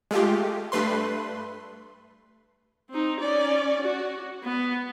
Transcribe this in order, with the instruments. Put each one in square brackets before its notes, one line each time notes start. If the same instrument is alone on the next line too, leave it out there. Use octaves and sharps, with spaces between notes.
[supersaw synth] G#3 A3 F4 G4
G2 A3 B4 C6
[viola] C4 D#4
C#4 D5
F#4
B3